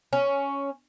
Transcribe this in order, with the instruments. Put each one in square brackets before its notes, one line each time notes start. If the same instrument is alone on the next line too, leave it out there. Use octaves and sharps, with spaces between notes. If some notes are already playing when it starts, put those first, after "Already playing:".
[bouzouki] C#4